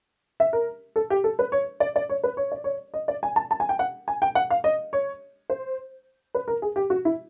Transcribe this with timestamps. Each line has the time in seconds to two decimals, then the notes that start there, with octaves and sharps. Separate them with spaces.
0.40 E5
0.53 A#4
0.96 A4
1.10 G4
1.24 A4
1.39 B4
1.52 C#5
1.80 D5
1.96 D5
2.09 C#5
2.24 B4
2.37 C#5
2.52 D5
2.64 C#5
2.94 D#5
3.08 D5
3.23 G#5
3.36 A5
3.51 A5
3.60 G#5
3.69 G5
3.79 F#5
4.08 G#5
4.22 G5
4.35 F#5
4.51 F5
4.64 D#5
4.93 C#5
5.50 C5
6.35 B4
6.48 A#4
6.62 G#4
6.76 G4
6.90 F#4
7.05 E4